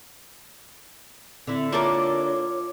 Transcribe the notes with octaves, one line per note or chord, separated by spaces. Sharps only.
D3 C4 E4
A#3 F4 A4 A#4 C#5 D6